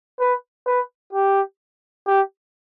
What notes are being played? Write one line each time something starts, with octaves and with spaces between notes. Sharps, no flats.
B4
B4
G4
G4